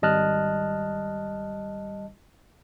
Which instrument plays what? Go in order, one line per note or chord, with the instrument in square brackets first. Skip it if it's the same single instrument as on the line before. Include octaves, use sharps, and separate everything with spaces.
[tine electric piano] G#1 G3 D#5 A5 F6 F#6